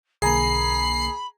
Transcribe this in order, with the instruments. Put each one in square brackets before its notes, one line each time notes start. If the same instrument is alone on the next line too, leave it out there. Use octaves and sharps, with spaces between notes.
[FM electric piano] B1 D3 A#3 [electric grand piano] G#4 G#5 A#5 [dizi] B5 [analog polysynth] C7